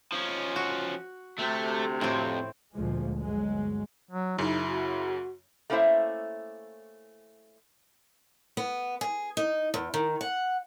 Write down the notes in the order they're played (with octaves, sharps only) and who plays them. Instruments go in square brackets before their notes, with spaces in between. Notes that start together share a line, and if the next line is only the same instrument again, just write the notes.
[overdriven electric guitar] F3 C#4
[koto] F#4
[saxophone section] D2 C3 [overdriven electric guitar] A3
[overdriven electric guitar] F2 [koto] A2 C4
[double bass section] D2 A#2 F3 G#3
G1 F#3 G#3
[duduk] F#3
[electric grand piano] F#2 C#3 [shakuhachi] D#4 [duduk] E4
[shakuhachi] F#4
[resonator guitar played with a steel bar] A3 A#3 C#4 E4 C5 E5
[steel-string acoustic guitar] B3
G#4
D#4
E2
D#3
F#5